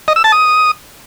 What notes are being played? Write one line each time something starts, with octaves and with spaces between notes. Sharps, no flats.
D#5
E6
A5
D#6